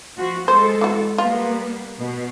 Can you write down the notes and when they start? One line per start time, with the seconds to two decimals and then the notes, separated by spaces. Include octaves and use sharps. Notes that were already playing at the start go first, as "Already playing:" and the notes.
0.17 F3 F#4
0.48 G#3 A4 C5
0.81 E3 F#4
1.18 G3 A#3 B3 F4
1.99 B2